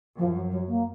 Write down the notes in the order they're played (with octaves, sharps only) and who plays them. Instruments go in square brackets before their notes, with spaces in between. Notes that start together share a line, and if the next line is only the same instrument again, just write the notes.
[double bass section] F#2 [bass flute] F3
[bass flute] F#3
F#3
A#3